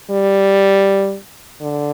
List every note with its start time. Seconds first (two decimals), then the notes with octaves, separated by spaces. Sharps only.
0.10 G3
1.62 D3